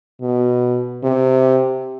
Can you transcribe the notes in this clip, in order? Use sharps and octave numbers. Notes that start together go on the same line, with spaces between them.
B2
C3